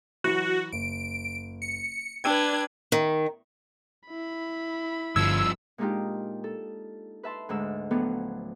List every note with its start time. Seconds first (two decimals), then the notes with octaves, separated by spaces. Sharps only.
0.24 E3 F#3 F#4
0.72 F#1 D7
1.62 C#7
2.24 D4 B4 G5 E6 G#6
2.92 D#3
4.09 E4 B5
5.16 G1 G2 F3 E6 G#6
5.78 A#2 G#3 D4 D#4 F4 G4
6.44 A4
7.23 B4 E5 A5 C6
7.49 D2 G#2 G#3 E6
7.91 A2 F3 F#3 A3 B3 D4